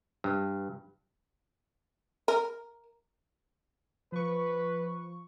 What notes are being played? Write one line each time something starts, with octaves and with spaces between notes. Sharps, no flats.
G2
A#4
F3 B4 C#6